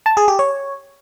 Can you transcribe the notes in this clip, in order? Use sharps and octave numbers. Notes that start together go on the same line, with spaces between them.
A5
G#4
G4
C#5